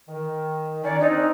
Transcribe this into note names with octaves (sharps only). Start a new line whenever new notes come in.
D#3
C#4 D#4 C#5 D5
C4 D4 D#4